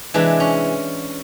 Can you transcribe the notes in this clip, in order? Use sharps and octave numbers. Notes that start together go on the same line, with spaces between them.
C3 E3 G#3 D4
C#4